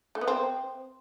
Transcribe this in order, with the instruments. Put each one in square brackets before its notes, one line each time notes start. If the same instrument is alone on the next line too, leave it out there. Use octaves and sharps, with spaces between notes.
[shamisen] A3
B3
C4